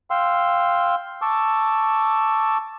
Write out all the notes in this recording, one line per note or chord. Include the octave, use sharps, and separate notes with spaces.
F5 G5 C6 E6
A5 C#6 D6 E6